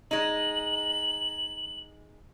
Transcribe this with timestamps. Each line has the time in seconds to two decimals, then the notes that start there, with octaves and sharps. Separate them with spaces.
0.11 G#3 D#4 F#7